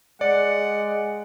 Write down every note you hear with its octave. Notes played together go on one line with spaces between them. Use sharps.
G#3 D5 F#5